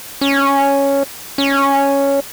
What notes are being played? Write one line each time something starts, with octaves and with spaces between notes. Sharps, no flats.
C#4
C#4